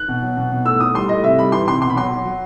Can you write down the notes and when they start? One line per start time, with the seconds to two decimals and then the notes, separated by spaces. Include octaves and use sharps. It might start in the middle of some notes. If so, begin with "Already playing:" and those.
Already playing: F#6
0.08 B2
0.22 F#3
0.37 B2
0.52 B2
0.65 A2 E6
0.80 A2 D#6
0.94 G3 C6
1.09 A2 D#5
1.24 C3 E5
1.38 G3 B5
1.52 E3 C6
1.67 C3 C6
1.82 B2 C6
1.90 B5
1.96 F#3 C6
2.11 F#3
2.25 F#3